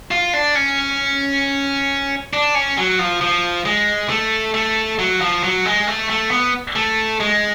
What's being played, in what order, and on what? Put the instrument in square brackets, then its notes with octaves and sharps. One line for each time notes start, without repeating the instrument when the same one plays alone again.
[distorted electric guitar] F4
D4
C#4
D4
C#4
F#3
F3
F3
G#3
A3
A3
F#3
F3
F#3
G#3
A3
A3
B3
A3
G#3